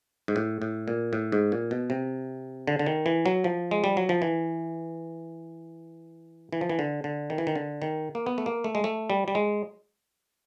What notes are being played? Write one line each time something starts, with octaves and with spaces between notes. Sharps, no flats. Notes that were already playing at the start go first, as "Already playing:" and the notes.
G#2
A2
A2
A#2
A2
G#2
A#2
B2
C3
D3
D3
D#3
E3
F#3
F3
G#3
G3
F#3
F3
E3
E3
F3
E3
D3
D3
D#3
E3
D#3
D3
D#3
A#3
B3
A3
A#3
A3
G#3
A3
G3
G3
G#3